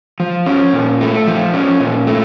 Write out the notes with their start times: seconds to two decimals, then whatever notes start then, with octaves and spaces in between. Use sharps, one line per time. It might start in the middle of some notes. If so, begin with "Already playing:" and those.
0.20 F3
0.46 C#4
0.73 A#2
1.01 A3
1.27 F3
1.54 C#4
1.80 A#2
2.07 A3